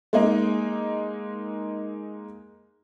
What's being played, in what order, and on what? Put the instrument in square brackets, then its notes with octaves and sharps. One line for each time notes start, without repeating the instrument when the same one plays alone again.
[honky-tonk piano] G#3 A#3 D#4